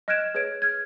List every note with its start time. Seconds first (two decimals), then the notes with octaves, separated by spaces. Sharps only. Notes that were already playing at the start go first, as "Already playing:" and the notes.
0.08 D#5 F6 F#6 G#6 D7 E7
0.35 G#4 B4 C#5 G#6 D7
0.62 F6 G#6